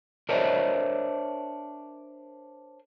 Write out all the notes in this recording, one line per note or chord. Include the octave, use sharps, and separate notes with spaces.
D4 A#4 C5 C#5 D#5 E5